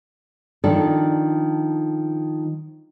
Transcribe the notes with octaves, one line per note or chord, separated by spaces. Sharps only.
D#3 F3 D4 A4